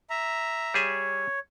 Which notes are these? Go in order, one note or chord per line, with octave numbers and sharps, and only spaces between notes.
E5 A#5
G3 G#4 C#5 E5